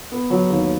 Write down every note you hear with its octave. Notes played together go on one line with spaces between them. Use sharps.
B3
F#3
D#2